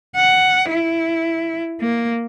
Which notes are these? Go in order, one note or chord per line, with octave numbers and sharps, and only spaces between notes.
F#5
E4
A#3